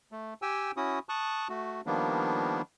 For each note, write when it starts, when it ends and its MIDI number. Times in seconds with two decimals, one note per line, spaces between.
0.12 0.34 57
0.42 0.72 67
0.42 0.72 79
0.42 0.72 80
0.42 0.72 88
0.77 0.99 61
0.77 0.99 64
0.77 0.99 66
0.77 0.99 87
1.09 1.48 81
1.09 1.48 85
1.09 1.48 87
1.09 1.48 90
1.49 1.81 57
1.49 1.81 66
1.86 2.62 51
1.86 2.62 53
1.86 2.62 55
1.86 2.62 58
1.86 2.62 59
1.86 2.62 62